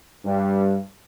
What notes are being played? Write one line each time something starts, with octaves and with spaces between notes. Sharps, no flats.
G2